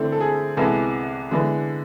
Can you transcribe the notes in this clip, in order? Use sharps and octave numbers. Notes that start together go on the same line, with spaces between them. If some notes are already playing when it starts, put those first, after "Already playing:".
Already playing: D3 A3 C4 E4 A4
A4
G#4
C2 C3 G#3 B3 E4 A4
D3 G#3 B3 E4